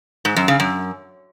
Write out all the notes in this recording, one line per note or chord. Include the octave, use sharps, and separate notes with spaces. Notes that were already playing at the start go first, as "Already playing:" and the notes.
G#2
F#2
C#3
F#2